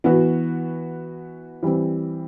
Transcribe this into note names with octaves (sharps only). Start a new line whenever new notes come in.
E3 B3 F#4
E3 G3 C4